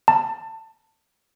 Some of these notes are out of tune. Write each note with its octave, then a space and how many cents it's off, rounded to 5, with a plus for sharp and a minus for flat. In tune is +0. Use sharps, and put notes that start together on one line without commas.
A5 +20